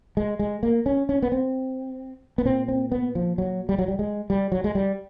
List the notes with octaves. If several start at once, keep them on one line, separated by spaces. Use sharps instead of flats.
G#3
G#3
A#3
C#4
C#4
B3
C4
B3
A#2 C4
C4
B3
F3
F#3
G3
F#3
G3
G#3
G3
F#3
G#3
G3